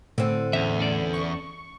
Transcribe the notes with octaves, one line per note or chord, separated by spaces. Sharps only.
A2 D3 C4
E2 C#4 E5
C#4 A4 D5
C#6